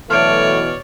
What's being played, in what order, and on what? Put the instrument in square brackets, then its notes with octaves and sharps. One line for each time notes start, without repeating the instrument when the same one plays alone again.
[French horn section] B2 E3 [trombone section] F#3 A3 [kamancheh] C#5 D5 [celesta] F6 D7